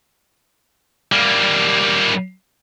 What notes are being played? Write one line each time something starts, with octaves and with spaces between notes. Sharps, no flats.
G3 A#3